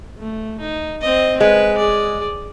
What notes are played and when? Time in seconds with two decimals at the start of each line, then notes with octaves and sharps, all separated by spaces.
0.18 A3
0.60 D#4
1.01 C4 D#5
1.40 G#3 B4
1.77 G#4 D5